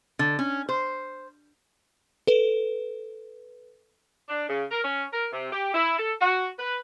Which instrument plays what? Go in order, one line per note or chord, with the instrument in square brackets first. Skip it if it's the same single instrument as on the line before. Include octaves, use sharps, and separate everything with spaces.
[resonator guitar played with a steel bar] D3
C#4
C5
[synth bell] A4 B4
[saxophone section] D4
C#3
A#4
C#4
A#4
C3
G4
E4
A4
F#4
B4